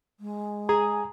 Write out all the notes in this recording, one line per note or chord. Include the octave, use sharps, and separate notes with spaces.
G#3
G#4 A#5